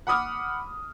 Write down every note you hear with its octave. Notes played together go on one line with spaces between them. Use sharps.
F#5 B5 D6 D#6 F6